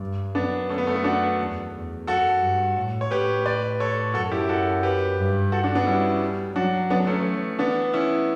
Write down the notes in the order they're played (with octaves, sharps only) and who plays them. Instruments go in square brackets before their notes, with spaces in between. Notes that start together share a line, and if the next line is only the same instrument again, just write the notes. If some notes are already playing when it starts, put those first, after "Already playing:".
Already playing: [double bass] G2
[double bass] F#2 [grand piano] B3 D4
[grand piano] A3 C#4
B3
A3
B3
D4 F#4
[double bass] E2
E2
[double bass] F#2 [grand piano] F#4 A4
[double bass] G2
A2
[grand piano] C#5
[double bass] A2 [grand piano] G4 B4
[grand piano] B4 D5
A4 C#5
[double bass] F#2 [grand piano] F#4 A4
[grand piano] E4 G4
F#4 A4
G4 B4
[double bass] G2
[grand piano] F#4 A4
D4 F#4
B3 D4
[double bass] G3 [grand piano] C#4 E4
[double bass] F#3 [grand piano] D4 F#4
[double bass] F#3 [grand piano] B3 D4
[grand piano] A3 C#4
[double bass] E3
[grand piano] B3 D4
C#4 E4